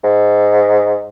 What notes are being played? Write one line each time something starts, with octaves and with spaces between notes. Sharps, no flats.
G#2